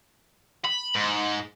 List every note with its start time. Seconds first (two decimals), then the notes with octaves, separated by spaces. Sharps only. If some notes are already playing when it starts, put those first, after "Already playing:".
0.64 B5
0.95 G#2